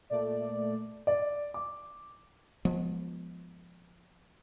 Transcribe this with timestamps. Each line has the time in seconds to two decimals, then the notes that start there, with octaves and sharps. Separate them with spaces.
0.10 A#2 A3 D5
1.07 D5
1.54 D6
2.65 F3 G#3 B3